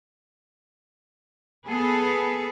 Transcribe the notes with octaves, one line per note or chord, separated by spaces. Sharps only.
B3 G#4 A4 B4